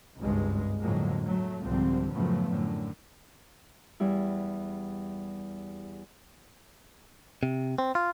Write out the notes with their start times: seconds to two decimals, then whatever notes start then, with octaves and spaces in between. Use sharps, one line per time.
0.20 G#1 C#2 G2 G#3
0.81 F2 A2 D3 F#3 G#3 A#3
1.27 F#3 A3
1.62 C2 G#2 D3 F3 G3 C4
2.12 F#2 A2 C#3 F3 A3 B3
2.46 F#2 A2 D3
4.00 E2 G3 E4
7.43 C3
7.78 C4
7.95 F4